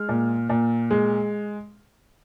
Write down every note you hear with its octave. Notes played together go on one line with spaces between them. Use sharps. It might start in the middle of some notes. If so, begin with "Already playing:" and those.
Already playing: G#3 F6
A#2
A#2
G#3